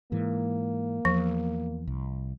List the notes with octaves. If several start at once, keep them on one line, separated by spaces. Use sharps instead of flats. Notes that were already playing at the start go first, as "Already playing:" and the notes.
G#2 E3 A#3
E2 F3
C2